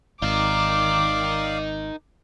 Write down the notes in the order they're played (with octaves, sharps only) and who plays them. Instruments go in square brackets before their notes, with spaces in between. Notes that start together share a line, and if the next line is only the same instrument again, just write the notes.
[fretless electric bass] G#1 [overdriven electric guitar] D#4 A#4 [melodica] D5 F5 [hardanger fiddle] D6